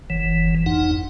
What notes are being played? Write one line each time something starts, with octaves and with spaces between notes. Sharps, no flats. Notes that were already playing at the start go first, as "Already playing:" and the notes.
F#1 E3
F2 D#4 F#5